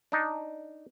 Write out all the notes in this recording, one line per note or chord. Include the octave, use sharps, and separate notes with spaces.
D4 D#4